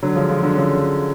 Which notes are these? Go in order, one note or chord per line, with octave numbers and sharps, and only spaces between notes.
D3 F#3
F3 G#3
F3 G#3
D3 F#3
C#3 F3